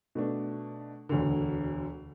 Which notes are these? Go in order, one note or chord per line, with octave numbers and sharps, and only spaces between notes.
B2 A3 D4
E1 D2 D3